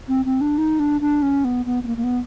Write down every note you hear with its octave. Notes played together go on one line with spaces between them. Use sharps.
C4
C4
D4
D#4
D4
D4
C#4
B3
B3
B3
A#3
A#3
B3